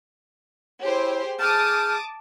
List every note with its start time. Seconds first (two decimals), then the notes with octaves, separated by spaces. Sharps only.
0.82 E4 G4 G#4 C5 C#5
1.40 G#4 A5 D6 D#6 F6 G6